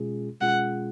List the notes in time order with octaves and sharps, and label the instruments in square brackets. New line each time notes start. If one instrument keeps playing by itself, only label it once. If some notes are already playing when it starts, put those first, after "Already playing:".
Already playing: [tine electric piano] B2 G#3 C#4 F4 G#4
[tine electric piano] B2 G#3 C#4 F4 G#4 [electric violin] F#5